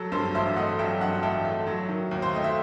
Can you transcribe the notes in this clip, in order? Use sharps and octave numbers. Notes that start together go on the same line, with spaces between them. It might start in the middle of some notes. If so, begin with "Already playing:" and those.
Already playing: F#3 A4
G2 A4 C5
A1 C5 E5
A3 D#5 F#5
F#3 E5 G5
G2 F#5 A5
A1 E5 G5
A3
F#3
D#3
D#2
C5
A3 D#5
E5